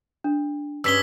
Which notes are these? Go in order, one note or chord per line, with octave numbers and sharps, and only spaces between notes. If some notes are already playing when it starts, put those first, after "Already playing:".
D4
G2 C#4 G#4 E6 B6 G7